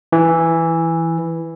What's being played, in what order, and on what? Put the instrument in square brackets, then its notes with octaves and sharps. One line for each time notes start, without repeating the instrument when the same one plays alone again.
[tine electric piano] E3